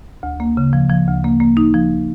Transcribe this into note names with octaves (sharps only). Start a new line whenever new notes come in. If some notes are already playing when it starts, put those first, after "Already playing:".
D2
A#3
C#3
F3
F3
D2
A#3
A#3
D#4
F3